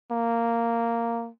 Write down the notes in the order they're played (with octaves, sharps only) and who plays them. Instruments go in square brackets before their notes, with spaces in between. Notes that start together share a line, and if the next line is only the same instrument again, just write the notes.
[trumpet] A#3